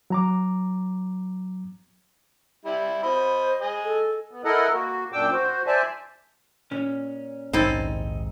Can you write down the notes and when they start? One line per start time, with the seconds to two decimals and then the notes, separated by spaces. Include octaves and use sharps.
0.10 F#3 A#5 D6
2.65 G3 E4
3.03 C5 D#5 B5
3.61 G#4 D#5
3.84 A4
4.31 B3
4.44 E4 A4 A#4 D#5 F#5
4.73 A#3 F#4
5.12 F#2 A#2 D4 G5 D6 E6
5.32 F#4 C5
5.67 C5 D5 E5 G#5 A5
6.71 A#2 C#4
7.53 A#1 D#2 G#2 C4 D#4 E4 A4